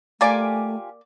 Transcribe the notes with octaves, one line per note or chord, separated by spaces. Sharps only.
A3 A#3 F4 G4 D5 G#5